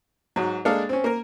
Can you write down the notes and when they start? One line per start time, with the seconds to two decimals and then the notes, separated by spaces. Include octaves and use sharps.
0.36 G#2 F#3
0.65 G#3 A#3 D4 A4 F5
0.89 C4 C#4
1.04 A#3 A#4